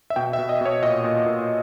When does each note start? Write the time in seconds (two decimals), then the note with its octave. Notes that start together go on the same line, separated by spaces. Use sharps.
0.10 E5
0.16 B2 G5
0.33 E5
0.39 B2
0.49 D#5
0.61 B2 C#5
0.82 A#2 D#5
1.04 A#2
1.26 A#2